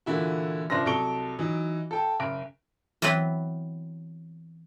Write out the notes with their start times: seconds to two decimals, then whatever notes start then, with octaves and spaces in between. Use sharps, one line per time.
0.06 A#2 D3 E3 E4 F#4
0.70 F#1 F3 D4 B4 C6 A#6
0.85 C2 F#3 A4 C#6 D7 G7
1.39 E3 F#3 D#4
1.91 A4 G5 A5
2.20 F#1 D7
3.02 E3 F#3 B3 C4 B4